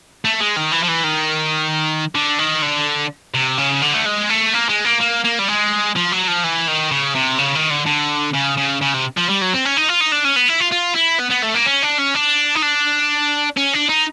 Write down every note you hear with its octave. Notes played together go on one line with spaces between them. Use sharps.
A3
G#3
D#3
E3
F3
E3
D#3
D3
D#3
D3
C3
C#3
D3
A3
G#3
A3
A#3
G#3
A#3
A#3
A#3
G3
G#3
F3
F#3
F3
E3
D#3
C#3
C3
C#3
D#3
D3
D3
C#3
C#3
C#3
C3
F3
G3
F#3
C4
C#4
D#4
F4
D#4
D4
C#4
B3
E4
F4
F4
E4
B3
B3
A3
A#3
C#4
D4
C#4
D4
D#4
D4
C#4
D4
D#4